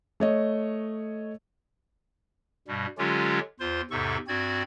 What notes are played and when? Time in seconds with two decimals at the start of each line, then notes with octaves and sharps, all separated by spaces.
0.20 A3 C#5 D#5
2.68 G2 B2 G3
2.98 D3 F#3 G#3 C#4 F4 G4
3.60 E2 F4 C5 C6
3.91 E2 G#2 C3 A4 C#6
4.28 G2 C4 F#4 D5 G#6